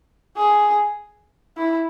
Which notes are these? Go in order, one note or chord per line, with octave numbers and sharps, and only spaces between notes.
G#4
E4